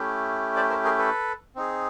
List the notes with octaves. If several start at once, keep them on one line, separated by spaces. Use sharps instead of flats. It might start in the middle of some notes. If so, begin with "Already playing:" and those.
Already playing: A3 C#4 E4 G4
C5 D5
A#4 C5
G#4 A#4
A4 B4
C4 D#4 G#4